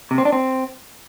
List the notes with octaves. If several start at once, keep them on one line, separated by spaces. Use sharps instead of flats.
C3
C4
D4
C4